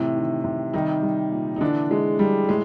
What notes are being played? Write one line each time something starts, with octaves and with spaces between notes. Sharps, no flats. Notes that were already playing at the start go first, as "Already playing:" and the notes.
Already playing: A2 C3 E3
D#3
C3
D#3 G3 D#4
G3
A#2
D#4
D3 E3 D4
E3 G#3
G3
A2 G#3